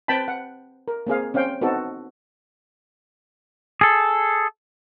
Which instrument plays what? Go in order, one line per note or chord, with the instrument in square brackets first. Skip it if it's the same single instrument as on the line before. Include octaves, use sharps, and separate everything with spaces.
[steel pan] C4 B4 G5 A5 B5
F#5
A#4
A#3 C4 G#4 F5
C4 C#4 F5 G5
B3 C4 D#4 F#4 A4
[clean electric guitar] G#4 A4